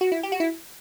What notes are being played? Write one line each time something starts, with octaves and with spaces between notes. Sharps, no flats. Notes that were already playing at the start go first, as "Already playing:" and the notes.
F#4
E4
G4
F#4
E4